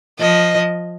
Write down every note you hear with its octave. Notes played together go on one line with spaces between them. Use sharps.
F3 D#5